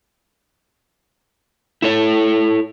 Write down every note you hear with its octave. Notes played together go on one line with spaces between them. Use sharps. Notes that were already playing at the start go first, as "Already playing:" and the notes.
E4 A4 C#5